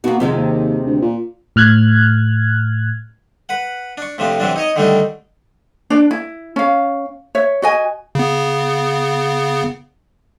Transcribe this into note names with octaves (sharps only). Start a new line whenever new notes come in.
B2 A#3 F#4
F2 C3 D#3 G#3
D#2
D2
A#2
A2 F6 F#6 G#6
B4 F#5
D4 C#6
A2 C3 F3 D4
C3 E3 F#3 D4
D#4 C#5 D#5
D3 D#3 G3 A3 D4 D#4
D4 D5
E4
C#4 F5
C#5 E5
F#4 D#5 G#5
C#3 B3